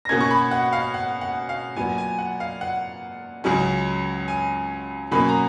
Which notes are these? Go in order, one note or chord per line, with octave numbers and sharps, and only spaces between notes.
A#6
B2 A#3 C#4 G#6
C#6
B5
F#5
F5
F#5
F#5
F5
A#2 F#3 B3 G#5
G#5
F#5
F5
F#5
C#2 C#3 F#3 C#4
G#5
B2 F#3 A#3 C#4 B5
A#5